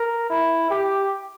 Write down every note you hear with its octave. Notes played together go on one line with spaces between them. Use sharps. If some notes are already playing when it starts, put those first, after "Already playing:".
Already playing: A#4
E4
G4